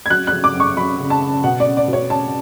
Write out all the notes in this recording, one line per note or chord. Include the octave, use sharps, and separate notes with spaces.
G#6
F#3 F#6
F#6
F#3
D6
F#2
C#6
F#3 B5
C#3
A5
C#3
B2 F#5
D5
C#4
D5
B2
C#5
C#4 A5